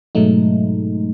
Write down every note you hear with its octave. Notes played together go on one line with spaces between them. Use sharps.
G#2 B2 F#3 G#3 A3 D#4